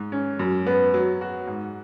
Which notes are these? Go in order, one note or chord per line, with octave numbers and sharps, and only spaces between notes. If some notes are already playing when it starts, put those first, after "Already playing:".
Already playing: G#2
C#4
F#2
B3
F#3
F#4
G#2